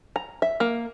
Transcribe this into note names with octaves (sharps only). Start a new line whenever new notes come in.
A#5
E5
A#3